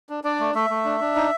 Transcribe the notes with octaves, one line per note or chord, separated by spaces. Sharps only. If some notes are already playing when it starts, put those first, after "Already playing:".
D4
D4 D5
A3
A3 E5
A3
D4
D4
D#4